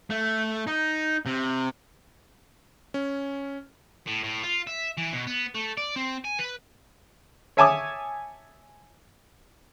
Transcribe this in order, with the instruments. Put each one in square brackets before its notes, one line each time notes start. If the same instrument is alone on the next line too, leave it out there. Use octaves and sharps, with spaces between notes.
[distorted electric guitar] A3
D#4
C3
[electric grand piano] C#4
[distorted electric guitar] A2
A2
F4
E5
E3
B2
B3
A3
D5
C4
G#5
B4
[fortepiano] C#5 E5 G#5 A5 D6 D#6